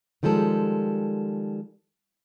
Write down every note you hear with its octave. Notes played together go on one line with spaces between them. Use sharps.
D#3 F3 G3 G#3 A4